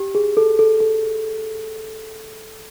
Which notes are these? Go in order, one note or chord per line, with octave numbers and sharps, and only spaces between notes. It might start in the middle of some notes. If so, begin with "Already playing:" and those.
Already playing: G4
G#4
A4
A4
A4